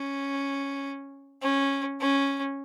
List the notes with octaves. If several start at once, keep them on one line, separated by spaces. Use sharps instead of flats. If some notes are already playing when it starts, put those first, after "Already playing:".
Already playing: C#4
C#4
C#4